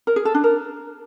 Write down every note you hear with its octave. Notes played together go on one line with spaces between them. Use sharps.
A#4
G#4
A4
D4
A#4